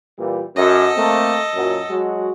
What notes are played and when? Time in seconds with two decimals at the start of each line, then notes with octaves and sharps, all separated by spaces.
0.18 A#2 E3 G3
0.56 F#2 A4 D#5
0.96 A3 A#3 C4
1.55 F#2 A#2 F#3
1.90 F#3 G#3 F#4